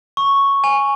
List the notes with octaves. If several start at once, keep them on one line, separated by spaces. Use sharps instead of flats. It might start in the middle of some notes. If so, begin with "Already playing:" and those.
C#6
G#5